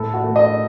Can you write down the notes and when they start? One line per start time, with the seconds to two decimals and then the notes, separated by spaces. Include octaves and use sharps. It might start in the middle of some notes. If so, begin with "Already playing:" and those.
Already playing: A2 A4
0.14 F#4
0.24 A3
0.36 D#5